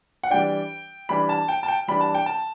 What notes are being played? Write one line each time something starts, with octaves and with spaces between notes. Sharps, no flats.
F#5
E3 G3 D4 G5
E3 G3 D4 B5
A5
G5
A5
G5
E3 G3 D4 B5
A5
G5
A5